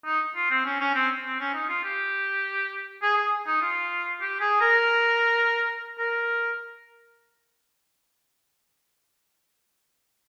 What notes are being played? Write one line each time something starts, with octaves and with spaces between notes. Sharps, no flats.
D#4
F4
C4
C#4
C#4
C4
C4
C#4
D#4
F4
G4
G#4
G#4
D#4
F4
G4
G#4
A#4
A#4